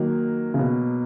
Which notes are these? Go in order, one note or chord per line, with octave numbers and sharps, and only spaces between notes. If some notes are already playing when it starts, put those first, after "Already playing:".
Already playing: D#3 F#3 A#3 D#4
C#3
B2